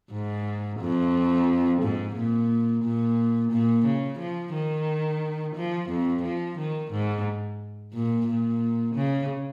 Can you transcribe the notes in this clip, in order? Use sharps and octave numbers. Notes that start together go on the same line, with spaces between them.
G#2
F2
G#2
A#2
A#2
A#2
C#3
F3
D#3
F3
F2
F3
D#3
G#2
A#2
A#2
C#3